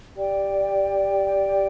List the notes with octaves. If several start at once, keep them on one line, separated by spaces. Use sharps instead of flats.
G4 D5 G5